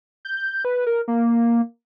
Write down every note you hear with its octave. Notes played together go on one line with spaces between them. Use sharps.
G6
B4
A#4
A#3